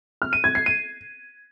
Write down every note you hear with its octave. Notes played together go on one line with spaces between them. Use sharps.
F6
D#7
G#6
C7
D#7